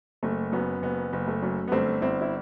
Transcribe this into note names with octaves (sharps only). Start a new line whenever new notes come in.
F#1 A3
F#2 B3
F#1 B3
F#1
A3
F#2
B3
G1 A3 C4
G1 C4 E4
E4